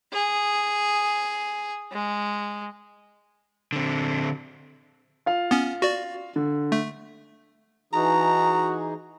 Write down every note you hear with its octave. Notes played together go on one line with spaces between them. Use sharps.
G#4
G#3
D3 C4
F4 F5
B3 C#4
F#4 D5
D3
A3
E3 D#4 F#4 G#4 A#5